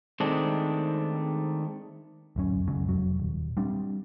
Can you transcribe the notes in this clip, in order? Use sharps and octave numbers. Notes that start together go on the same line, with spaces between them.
D#3 G#3 A3 C4 D4
D1 F#2 C#4
F#1 C#2 F#2 C#4
F1 F#3
D#1
G3 C4 D4